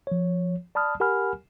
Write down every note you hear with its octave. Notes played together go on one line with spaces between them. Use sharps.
F3 C#5
D5 A5 B5 D#6 F6
G4 A#4 F#5 G#5 B5 F6